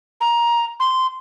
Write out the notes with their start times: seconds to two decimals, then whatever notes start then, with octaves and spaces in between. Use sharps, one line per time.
0.21 A#5
0.80 C6